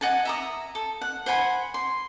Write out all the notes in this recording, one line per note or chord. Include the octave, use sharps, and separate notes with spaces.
D#5 F#5 G#5 A5
E5 A#5 D#6
A4
F#5
C5 F#5 G#5 B5
C6